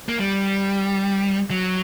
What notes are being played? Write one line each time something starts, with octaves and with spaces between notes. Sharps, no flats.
A#3
G3
F#3